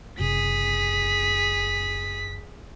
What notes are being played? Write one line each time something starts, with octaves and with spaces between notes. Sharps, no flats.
F#1 C3 G#4 B6